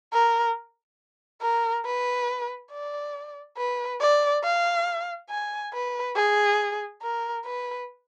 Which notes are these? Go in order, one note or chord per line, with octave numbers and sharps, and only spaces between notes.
A#4
A#4
B4
D5
B4
D5
F5
G#5
B4
G#4
A#4
B4